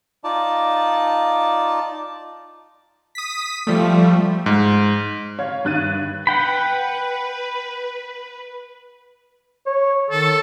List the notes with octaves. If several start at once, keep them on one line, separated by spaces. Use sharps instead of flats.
D#4 F4 D5 A5
D#6 B6
F3 G3 A3
G#2
C#5 F5 G#6
G2 D#3 F#6 A6 D#7
B4 F#5 G5 B5
C#5
D#3 A4